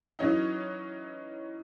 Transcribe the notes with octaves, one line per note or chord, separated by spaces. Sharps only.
E3 F#3 C#4 D#4